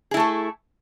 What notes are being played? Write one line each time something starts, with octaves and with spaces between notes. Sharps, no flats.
A3 E4 G#4 A4